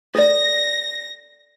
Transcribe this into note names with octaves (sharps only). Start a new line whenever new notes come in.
A4 D5 A#6